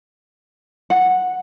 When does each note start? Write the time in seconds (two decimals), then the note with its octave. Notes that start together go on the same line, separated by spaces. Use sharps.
0.90 F#5